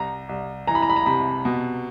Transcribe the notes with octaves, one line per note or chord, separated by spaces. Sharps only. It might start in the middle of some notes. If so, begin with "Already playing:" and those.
Already playing: C2 A#5
C2
E3 A#5
B5
A#5
B5
A#5
C3 B5
B2